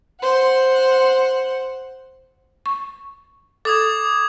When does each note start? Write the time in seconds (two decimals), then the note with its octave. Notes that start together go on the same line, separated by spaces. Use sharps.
0.20 C5 F#5
2.66 C#6
3.65 A4 D6 D#6 G#6